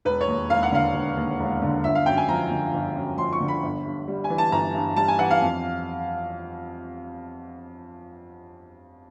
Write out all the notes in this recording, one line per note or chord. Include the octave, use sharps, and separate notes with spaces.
E1 B4
C#5
D#2
E1 F5
F#5
D3 F5
E1
D#2
E1
D3
G1 E5
F5
F#2 G5
G#5
F3 A#5
D3
G1
F#2
F3 C6
C#6
D3
B5
G1
G2
G3
G#5
E3
A5
G1 A#5
G2
G3 A5
G#5
E3 F#5
F5
F2